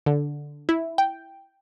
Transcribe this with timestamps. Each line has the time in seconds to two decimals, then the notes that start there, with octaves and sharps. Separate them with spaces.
0.06 D3
0.69 E4
0.98 G5